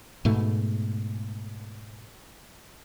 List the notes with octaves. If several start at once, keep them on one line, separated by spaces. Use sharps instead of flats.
G#2 B2 A3